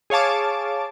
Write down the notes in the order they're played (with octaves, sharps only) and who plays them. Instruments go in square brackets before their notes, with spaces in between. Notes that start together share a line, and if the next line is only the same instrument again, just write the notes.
[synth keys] G#4 C#5 F5 A5 D6